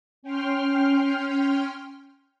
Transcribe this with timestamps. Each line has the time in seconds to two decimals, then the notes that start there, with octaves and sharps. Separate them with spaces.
0.23 C#4 G5 C6 F6